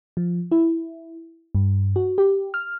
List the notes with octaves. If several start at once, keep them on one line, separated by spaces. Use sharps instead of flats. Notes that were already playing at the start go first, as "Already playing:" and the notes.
F3
E4
G2
F#4
G4
F6